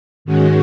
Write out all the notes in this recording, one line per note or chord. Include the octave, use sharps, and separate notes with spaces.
G#2 D#3 G#3 C#4 F#4